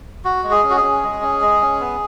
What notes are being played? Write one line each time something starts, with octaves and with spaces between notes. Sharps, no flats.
F#4
G#3
G#4
C#4
F#4
G#4
C#4
G#3
C#4
G#3
C#4
B3